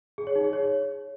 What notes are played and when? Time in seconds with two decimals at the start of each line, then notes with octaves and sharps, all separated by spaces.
0.18 G#4
0.27 C#5
0.36 D#4
0.44 G#4
0.53 C#5